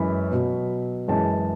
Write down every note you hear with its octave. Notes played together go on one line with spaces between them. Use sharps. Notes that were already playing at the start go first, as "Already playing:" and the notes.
Already playing: F#2 E3 G#3 B5
B2 F#3
F#2 E3 G#3 A5